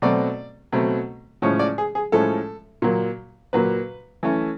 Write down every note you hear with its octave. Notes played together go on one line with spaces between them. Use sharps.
B2 F#3 A3 C4 D5
B2 F#3 A3 C4
A2 F3 G#3 C#4 C#5
D5
G#4
G#4
A2 F3 G#3 C#4 A4
A#2 F#3 A#3
A#2 F#3 A#3 B4
E3 A3 C#4